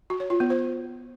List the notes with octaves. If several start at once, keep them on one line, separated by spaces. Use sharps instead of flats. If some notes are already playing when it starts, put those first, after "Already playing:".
F#4
C#5
F4
B3
C5